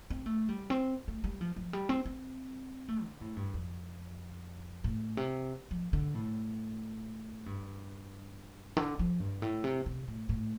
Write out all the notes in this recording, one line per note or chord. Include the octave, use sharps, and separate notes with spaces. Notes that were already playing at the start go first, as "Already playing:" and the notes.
C4
A3
G3
C4
A3
G3
F3
F3
G3
C4
C4
A3
D3
A2
G2
F2
A2
C3
F3
D3
A2
G2
D3
F3
G2
A2
C3
C3
A2
A2